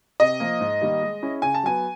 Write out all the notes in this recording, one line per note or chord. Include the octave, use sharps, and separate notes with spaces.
C3 D#5
F3 A#3
G#2
D#3 G3 A#3
G#3
C#4 E4 G#4
C#3 G#5
A5
F#3 B3 G#5